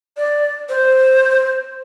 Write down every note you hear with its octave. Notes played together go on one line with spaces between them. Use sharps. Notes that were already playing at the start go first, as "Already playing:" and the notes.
D5
C5